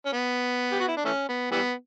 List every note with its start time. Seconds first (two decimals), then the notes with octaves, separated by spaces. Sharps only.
0.06 C#4
0.13 B3
0.72 G4
0.80 F#4
0.88 E4
0.97 D4
1.05 E3 A3 C#4
1.28 B3
1.52 E3 G3 B3